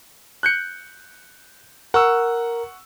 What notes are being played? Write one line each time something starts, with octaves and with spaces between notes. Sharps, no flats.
F#6 G6 C#7
A#4 F#5 C#6 E6